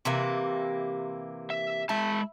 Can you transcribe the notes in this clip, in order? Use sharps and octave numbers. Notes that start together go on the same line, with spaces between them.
C3 E3 A#3
E5
G#3 E4 A5